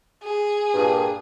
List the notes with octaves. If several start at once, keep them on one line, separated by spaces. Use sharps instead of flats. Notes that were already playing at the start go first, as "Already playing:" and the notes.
G#4
G2 A#2